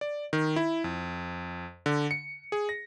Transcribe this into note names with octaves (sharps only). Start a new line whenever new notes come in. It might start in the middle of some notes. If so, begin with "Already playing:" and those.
D5
D#3
E4
F2
D3
C#7
G#4
A#6